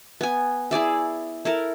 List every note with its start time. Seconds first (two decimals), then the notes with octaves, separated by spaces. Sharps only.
0.21 B3 G#5
0.71 E4 G#4 D5 E5
1.45 E4 A4 A#4